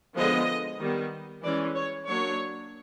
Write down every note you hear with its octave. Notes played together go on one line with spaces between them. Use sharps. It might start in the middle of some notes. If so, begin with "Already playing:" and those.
D3 F3 G#3 B3 D#5
D#3 G3 B3
E3 G#3 C#4 D5
C#5
F#3 A#3 D4 C#5